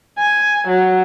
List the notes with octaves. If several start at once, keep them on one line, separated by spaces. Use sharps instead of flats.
G#5
F#3